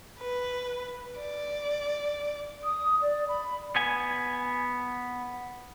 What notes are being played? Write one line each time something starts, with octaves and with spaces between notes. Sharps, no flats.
B4
D5
D#6
D5
B5
B3 G#5